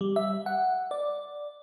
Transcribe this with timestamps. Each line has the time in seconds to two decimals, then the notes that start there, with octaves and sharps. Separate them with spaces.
0.01 G3
0.16 E5
0.46 F#5
0.91 D5